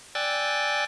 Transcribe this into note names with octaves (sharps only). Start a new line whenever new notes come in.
D5 G5 G#5 E6 F#6 A6